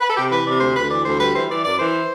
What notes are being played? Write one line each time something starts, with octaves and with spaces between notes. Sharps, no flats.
B4
A4
C3 G4
E3 B4
C3 D5
D2 C5
D2 B4
E3 D5
D2 C5
G3 B4
E3 C5
E3 D5
F#2 D5
E3 C5